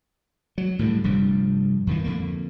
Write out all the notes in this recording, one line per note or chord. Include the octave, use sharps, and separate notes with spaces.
F#3
A2 D3 E3 G3
F1 G2 F3 G3
F2 D#3 E3
F2 D3 A#3